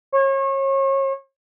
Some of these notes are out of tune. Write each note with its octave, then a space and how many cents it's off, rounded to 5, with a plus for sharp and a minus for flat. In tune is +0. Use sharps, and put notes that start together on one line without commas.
C#5 -35